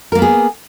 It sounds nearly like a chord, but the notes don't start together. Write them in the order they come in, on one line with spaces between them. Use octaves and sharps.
A#4 A#3 B3 G#4